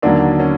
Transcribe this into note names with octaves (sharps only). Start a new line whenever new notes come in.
D#2 D3 F#3 A#3 D4
C#4